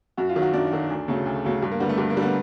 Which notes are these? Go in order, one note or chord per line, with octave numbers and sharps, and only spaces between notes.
F#2 F#4
F4
D#3 F#3
F#4
F#2 D4
D#3 F#3
D2
C#3 F#3 A3
D2
C#3 F#3 A3
G2
A#3
D3 G3 B3
A3
G2
A#3
D3 G3
B3